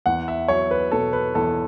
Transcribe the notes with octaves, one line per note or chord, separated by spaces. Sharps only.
E2 F#5
E5
F#3 C#5
B4
B2 A4
B4
E2 A4